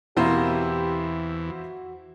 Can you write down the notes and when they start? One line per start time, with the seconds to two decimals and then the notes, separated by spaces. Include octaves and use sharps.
0.17 E2 B2 E3 A#3 C4 E4 G4 C5
1.47 F#4